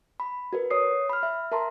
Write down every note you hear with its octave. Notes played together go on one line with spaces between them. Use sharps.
B5
F#4 A#4 B4
C#5 D#6 C7
B5 F6
E5
A#4 E5 A5 A#5 C6